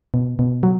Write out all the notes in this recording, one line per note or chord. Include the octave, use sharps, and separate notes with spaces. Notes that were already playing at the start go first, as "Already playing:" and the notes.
B2
B2
F#3